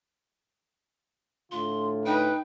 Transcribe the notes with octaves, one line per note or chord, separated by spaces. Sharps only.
A2 D3 F4 C6
D#4 B4 G5